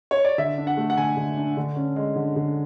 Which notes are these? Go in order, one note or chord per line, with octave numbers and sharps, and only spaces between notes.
C#5
D5
D3 E5
D4
F#5
A3
F#5
D3 G#5
D3
D4
D3
C#4
G#3
D3
D3